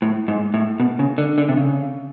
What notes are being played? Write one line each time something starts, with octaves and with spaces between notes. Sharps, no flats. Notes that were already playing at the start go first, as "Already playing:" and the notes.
A2
G#2
A2
B2
C#3
D3
D3
C3
C#3